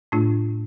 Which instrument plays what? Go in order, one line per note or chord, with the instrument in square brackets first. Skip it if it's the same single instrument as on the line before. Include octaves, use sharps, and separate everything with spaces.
[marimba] A2 A3 D4 F4